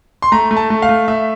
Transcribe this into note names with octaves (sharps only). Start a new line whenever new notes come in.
C6
A3 A#5
A3
A5
A3
F5
A3
A3 E5